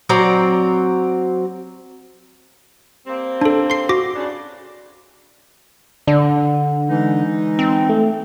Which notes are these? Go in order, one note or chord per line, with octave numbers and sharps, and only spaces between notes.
F#3 C4 D5 A#5
G3 A#3 C4
D4 A4
C6 C7
F#4 D6 A#6
C#3 D4
D3 D4
E3 G#3 D#4
C4
A3